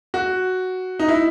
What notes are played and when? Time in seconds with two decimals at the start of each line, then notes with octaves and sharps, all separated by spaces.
0.14 F#4
0.99 D#4
1.09 E4